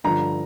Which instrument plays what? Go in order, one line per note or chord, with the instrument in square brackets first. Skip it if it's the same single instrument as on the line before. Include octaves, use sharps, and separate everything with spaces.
[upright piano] G2 D3 F3 A#5